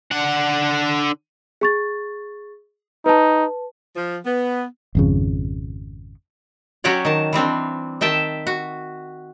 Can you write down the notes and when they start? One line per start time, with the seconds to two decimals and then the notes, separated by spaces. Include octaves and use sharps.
0.12 D3 F#5
1.61 G#4 C#6 A6
3.06 D#4 B4 A5
3.96 F3
4.25 B3
4.95 G#1 F2 C#3
6.84 F#3 C#4 F#4 G4 C#5 D5
7.05 D#3 A5
7.33 E3 G3 C4 D4
8.01 D#3 E5 G5 A5
8.47 F#4